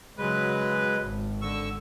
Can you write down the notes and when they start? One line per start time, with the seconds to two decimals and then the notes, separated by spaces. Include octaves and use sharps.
0.18 C#3 F#3 G#3 B4
1.02 G#1
1.42 D3 C#6 E6